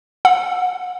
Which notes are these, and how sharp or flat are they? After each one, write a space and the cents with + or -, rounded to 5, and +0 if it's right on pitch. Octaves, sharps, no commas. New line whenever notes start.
F#5 -30 E6 +0